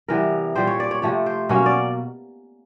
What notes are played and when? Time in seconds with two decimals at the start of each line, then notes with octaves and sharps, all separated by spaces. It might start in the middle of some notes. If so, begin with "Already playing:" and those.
0.08 C3 E3 G3 B3 A#4
0.55 A#2 G3 C4 C5
0.67 C#5
0.80 D5
0.91 C#5
1.02 C3 F3 A3 C4 C#5
1.26 C5
1.49 B2 F#3 A#3 C#4 C#5
1.66 D5